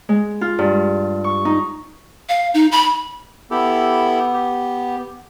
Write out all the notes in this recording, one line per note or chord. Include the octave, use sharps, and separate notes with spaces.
G#3
F4
G2
C#6
D#4
F5
D#4
B5
B3 E4 G4 A4
G4